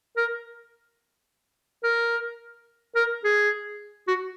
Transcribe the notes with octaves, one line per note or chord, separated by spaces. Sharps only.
A#4
A#4
A#4
G#4
F#4